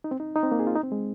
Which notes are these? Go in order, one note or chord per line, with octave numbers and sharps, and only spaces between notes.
D#4
C4
D#4
D#4
C4
A#3
G#4
F4
D#4
C4
G#3